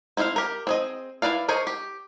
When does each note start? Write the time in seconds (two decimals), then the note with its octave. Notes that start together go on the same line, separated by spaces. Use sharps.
0.17 C4 E4 C5 E5 F5
0.36 G4 A#4
0.67 C4 G#4 D#5
1.22 E4 F#4 B4 D5 F5
1.48 G#4 A#4 C5 C#5 D#5
1.67 G4